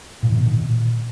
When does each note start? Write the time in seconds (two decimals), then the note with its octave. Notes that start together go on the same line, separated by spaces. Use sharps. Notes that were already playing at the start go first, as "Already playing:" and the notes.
0.23 A#2
0.30 D#3
0.37 B2
0.44 D#3
0.52 A#2